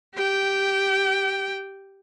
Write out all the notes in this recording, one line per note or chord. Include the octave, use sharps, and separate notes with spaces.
G4 G5